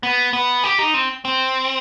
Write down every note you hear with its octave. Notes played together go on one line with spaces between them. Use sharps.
B3
B3
G4
D#4
C4
C4